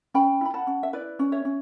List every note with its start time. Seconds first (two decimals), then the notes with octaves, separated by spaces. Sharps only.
0.14 C#4 G5 B5
0.41 E4 B5
0.54 F#5 A5
0.67 C#4
0.83 E5
0.93 E4 B4 D5
1.19 C#4
1.32 C#5 E5
1.45 C#4